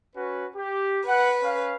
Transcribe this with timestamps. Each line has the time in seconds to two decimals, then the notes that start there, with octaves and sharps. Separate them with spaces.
0.15 C#4 F#4 B4
0.56 G4
1.07 B4 F#5
1.44 C#4 F5